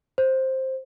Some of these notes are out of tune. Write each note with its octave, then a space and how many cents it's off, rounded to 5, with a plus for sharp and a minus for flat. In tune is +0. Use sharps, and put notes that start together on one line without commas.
C5 +10